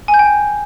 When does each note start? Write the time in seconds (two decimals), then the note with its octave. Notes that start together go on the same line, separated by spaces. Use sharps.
0.08 G#5
0.14 G6
0.19 G5